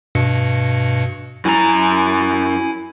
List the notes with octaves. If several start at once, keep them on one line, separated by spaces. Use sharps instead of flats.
G2 B2 C#7
F#2 E4 G#5 A#5